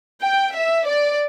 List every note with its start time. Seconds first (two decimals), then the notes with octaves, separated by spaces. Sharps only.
0.23 G5
0.54 E5
0.86 D5